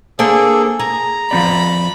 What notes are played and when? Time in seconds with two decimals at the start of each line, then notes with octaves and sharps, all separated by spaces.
0.19 A#3 C4 D4 G#4 A4
0.79 G#4 A#5
1.31 F3 C4 D5 B5